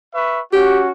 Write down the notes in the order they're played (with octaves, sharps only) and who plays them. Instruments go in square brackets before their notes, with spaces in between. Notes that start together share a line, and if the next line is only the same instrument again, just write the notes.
[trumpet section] B4 E5 C#6
[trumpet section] C#4 F#4 [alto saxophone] G4